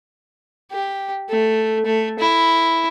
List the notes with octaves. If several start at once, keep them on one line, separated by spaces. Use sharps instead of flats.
G4
A3
A3
E4